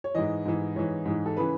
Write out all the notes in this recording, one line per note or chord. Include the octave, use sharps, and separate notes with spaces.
C#5
G#2 E3 D#5
G#2 E3
G#2 E3 C#5
G#2 E3
A4
C#3 E3 B4